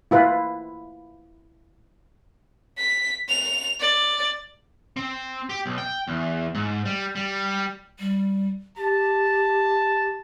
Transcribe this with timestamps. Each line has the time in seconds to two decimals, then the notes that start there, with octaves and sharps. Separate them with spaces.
0.11 E4 F4 B4
2.78 B6
3.29 F7
3.80 D5
4.97 C4
5.49 G4
5.66 B1
5.78 G5
6.08 E2
6.55 G#2
6.85 G3
7.15 G3
7.99 G3
8.77 G4 A5